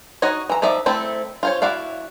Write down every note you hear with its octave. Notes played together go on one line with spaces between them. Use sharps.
D#4 F#4 C#5 D#5
E3 A#5
F3 D#4 D5 E5
A3 C4 E4 A4
F4 C5 C#5
E4 F#4 D5 F5